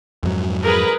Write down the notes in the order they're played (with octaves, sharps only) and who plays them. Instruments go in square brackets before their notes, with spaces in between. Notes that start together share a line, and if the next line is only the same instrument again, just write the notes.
[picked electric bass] F2 G#2 F#3
[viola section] G#4 A#4 B4